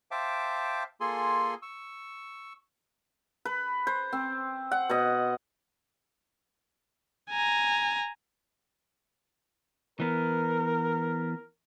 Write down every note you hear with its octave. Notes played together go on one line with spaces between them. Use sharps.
C5 E5 F5 G5 A5 D6
A#3 F4 G#4 A4 G#5 C6
C#6 E6
B4
C5
C4
F#5
B2 D#5
G#5 A#5
E3 B3 A#4